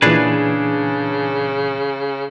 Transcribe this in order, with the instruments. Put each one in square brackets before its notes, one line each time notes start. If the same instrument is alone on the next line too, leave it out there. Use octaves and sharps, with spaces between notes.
[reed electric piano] A#2 E3 [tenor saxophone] C#3 [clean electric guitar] D4 G#4 B4